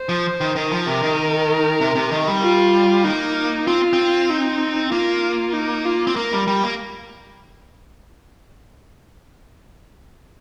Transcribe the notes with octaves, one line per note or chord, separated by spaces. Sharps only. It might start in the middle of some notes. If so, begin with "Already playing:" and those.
Already playing: C5
F3
D#3
D#3 A#4
F3
C3 A#4
D#3
C3
C3
D#3
G3
F4
A#3 D#4
C4 F4
C4
D#4
A#3 F4
D#4
F4
C4
A#3 A#4
G3
G3
A#3